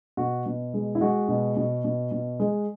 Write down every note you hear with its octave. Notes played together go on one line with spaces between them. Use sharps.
B2 F#4
B2
G#3
E4
G#3 F#4
B2
B2
B2
B2
G#3